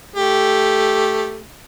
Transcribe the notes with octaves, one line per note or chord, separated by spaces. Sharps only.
A3 G4